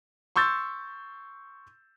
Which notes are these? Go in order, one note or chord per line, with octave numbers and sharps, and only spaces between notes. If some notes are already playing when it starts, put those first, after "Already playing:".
C6 C#6 E6 G6 A6